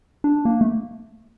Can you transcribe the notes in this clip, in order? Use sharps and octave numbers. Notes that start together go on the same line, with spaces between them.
D4
A#3
A3